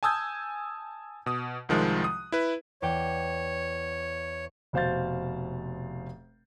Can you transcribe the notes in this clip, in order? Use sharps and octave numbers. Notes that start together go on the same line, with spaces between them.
G#5 A5 D#6 E6 G6 G#6
B2 D#6
C2 D#3 F3 G#3 F#6
D#6
E4 B4
E2 C#5 D5 G5
F1 B2 C5 F5 G6 A6